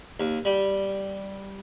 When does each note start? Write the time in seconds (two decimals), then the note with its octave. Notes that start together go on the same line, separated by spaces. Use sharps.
0.20 D#2
0.45 G3